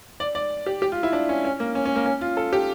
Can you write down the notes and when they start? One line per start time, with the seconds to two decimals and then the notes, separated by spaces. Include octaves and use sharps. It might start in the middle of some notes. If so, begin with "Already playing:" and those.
0.20 D5
0.35 D5
0.66 G4
0.82 G4
0.92 F4
1.03 E4
1.13 D4
1.29 C#4
1.45 C#4
1.60 A#3
1.75 C#4
1.85 C#4
1.96 A#3
2.06 C#4
2.21 F4
2.37 A4
2.53 G4